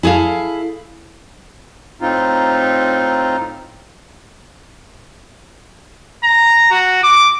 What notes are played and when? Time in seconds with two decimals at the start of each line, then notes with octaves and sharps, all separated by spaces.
0.03 E4 G#4 A4 F5
2.01 A2 C4 D#4 F4
6.24 A#5
6.71 F#4
7.03 D6